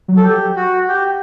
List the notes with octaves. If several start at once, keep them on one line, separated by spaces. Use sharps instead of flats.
F#3
A4
G4
F#4
G4